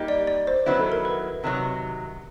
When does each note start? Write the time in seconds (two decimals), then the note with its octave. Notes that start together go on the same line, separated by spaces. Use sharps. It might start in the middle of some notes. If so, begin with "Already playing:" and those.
Already playing: G3 A#3 D#4 G4
0.08 D5
0.27 D5
0.47 C5
0.66 D#3 F#3 B3 E4 B4
0.79 A4
0.92 A#4
1.05 B4
1.44 C3 D#3 F#3